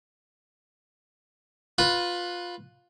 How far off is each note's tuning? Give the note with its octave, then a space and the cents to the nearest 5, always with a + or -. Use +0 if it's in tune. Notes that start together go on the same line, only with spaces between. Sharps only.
F4 +15 B4 +0